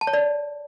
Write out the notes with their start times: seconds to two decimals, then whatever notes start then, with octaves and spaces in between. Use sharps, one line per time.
0.01 A5
0.07 C#5
0.13 D5